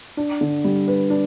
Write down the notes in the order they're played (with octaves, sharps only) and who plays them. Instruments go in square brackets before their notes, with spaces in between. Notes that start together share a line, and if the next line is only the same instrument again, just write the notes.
[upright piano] D4
D3
G3
B4
D4